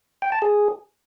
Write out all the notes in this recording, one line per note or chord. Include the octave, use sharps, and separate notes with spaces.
G5
A5
G#4